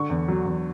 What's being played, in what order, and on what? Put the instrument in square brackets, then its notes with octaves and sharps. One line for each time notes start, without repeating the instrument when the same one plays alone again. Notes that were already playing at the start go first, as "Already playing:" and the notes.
Already playing: [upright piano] D3 C#6
E2
F#3
E2